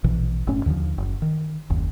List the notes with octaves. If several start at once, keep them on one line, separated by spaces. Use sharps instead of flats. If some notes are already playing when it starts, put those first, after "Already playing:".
A#1 B2 E3
F#1 A2 C#4
D#2 D3 D#3 F3
F#1
D#3
F#1 D#2